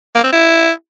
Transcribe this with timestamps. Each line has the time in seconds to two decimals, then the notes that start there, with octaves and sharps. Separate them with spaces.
0.15 A#3
0.24 C4
0.33 E4